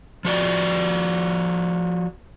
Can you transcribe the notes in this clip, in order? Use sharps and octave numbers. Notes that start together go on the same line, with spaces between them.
F3 F#4 D5